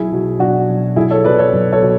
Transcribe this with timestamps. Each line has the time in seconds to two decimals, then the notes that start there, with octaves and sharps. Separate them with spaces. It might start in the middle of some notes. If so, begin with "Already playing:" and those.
Already playing: B1 E4 G#4
0.12 B2 F#3
0.39 B1 D4 F#4
0.68 B2 F#3
0.96 B1 E4 G#4
1.11 A4 C#5
1.24 B2 F#3 B4 D5
1.38 A4 C#5
1.53 B1
1.72 A4 C#5
1.82 B2